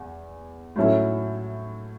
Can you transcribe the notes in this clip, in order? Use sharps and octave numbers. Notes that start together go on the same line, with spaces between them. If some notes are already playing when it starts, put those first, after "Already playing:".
Already playing: E2
A2 F#3 C#4 E4 A4